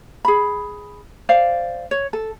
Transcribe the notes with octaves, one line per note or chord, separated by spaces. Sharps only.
G#4 B5
C5 D5 F5
C#5
A4